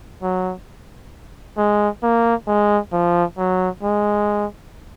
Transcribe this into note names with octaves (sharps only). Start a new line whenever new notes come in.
F#3
G#3
A#3
G#3
F3
F#3
G#3